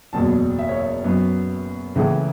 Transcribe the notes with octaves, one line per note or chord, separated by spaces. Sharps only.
F#1 E2 B2 F#3 A5
E5
C#5
E5
F#2 F#3 B3
C#2 C#3 E3 A3